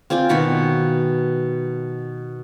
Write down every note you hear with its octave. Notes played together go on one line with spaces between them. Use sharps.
C4 F4 D5 G#5
B2 D#3 F#4 B5